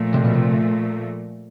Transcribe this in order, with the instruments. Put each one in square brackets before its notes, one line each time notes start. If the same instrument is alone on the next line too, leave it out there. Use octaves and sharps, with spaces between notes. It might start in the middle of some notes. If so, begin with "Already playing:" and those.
Already playing: [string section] A#2 F3 A3
[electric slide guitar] C3
B2
C3